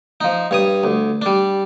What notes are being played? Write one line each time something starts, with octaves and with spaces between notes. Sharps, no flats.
F3 D#4
G2 C#5 D#6
D2
G3 D4